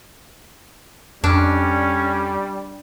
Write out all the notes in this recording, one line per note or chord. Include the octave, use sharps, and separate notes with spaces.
F2 G3 C#4 D4